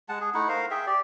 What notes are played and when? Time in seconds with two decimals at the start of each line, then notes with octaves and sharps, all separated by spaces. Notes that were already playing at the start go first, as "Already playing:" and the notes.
0.09 G#3 F#5 A5
0.20 G#4
0.34 A3 D#4 E4 F#5
0.48 A#4 C5 F5
0.71 G#4 E5 G5
0.87 G4 D5